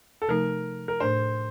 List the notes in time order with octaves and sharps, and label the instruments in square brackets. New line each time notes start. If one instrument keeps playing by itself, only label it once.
[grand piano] A4
[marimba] C3 F3 A3 D#4 [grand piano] A#4
[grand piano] A#4
[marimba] A2 A3 D4 [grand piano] C5